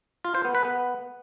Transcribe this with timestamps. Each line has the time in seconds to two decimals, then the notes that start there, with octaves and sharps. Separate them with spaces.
0.24 F4
0.35 C5
0.45 B3
0.55 B4
0.65 B3